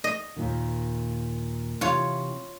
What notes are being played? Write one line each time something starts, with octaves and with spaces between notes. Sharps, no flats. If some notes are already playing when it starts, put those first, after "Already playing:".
D#5
D#2 A#2 D#3
C3 E3 F4 C#5